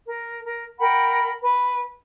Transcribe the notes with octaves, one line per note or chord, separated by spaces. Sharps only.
A#4
A#4
A#4 F#5 G5 B5
B4